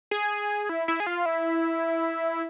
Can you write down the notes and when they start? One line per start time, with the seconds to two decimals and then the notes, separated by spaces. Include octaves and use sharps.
0.11 G#4
0.69 E4
0.88 E4
1.00 G#4
1.06 F4
1.26 E4